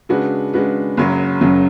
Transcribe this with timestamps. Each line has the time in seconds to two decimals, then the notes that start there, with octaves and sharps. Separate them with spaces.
0.09 C#3 G#3 D4 F#4 B4
0.54 C#3 G#3 D4 F#4 B4
0.97 F#1 F#2 C#3 F#3
1.41 F#1 F#2 C#3 F#3